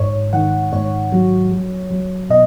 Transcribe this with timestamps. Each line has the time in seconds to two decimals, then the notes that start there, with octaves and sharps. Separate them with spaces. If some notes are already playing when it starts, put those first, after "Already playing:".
Already playing: G#2 C#5
0.33 D#3 F#5
0.72 G#2 C#5
1.12 F#3
1.51 F#3
1.90 F#3
2.30 B2 D#5